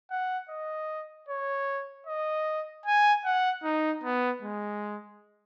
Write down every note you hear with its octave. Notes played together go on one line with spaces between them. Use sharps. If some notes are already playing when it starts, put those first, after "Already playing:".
F#5
D#5
C#5
D#5
G#5
F#5
D#4
B3
G#3